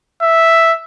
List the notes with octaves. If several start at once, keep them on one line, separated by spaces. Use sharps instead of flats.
E5